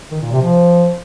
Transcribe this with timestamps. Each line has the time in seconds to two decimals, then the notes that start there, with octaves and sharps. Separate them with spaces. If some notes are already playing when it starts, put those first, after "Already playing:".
0.11 D#3
0.21 A#2
0.32 C3
0.42 F3